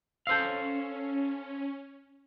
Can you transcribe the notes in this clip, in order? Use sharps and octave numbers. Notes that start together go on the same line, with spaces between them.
C#4 A4 C5 F5 E6 G6